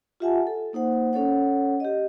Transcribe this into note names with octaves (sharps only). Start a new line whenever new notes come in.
F4 G4 E5 F#5 G#5 A5
A4
A#3 D#4 C5 F#5
C#4 A4 C#5 F#5
G4 D#5